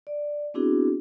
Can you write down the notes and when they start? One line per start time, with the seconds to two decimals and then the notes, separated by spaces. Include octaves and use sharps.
0.07 D5
0.54 B3 C4 D4 E4 F#4 G#4